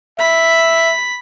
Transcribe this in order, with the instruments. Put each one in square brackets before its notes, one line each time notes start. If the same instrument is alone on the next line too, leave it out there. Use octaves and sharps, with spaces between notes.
[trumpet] E5 [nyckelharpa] B5